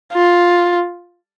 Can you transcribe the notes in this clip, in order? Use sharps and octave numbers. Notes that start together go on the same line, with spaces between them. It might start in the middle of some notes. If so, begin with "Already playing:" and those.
F4